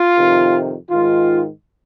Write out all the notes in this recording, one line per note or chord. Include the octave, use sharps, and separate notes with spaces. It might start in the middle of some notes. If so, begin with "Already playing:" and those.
Already playing: F4
F2 C3 D#3
G#2 D#3 F4